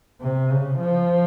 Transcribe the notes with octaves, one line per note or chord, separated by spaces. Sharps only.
C3
C#3
F3